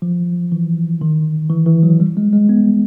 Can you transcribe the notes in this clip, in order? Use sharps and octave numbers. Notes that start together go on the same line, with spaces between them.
F3
E3
D#3
E3
E3
F#3
G3
G#3
G#3
B3